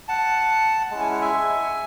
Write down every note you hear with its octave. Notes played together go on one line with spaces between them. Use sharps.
F#5 A5
G#3 C#4 E4 A5
G#5
F#5
E5 G#5